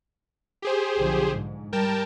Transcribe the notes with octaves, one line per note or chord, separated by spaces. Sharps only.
G4 G#4 C5
B1 D3 F3
G#2
G3 A#4 G5 A5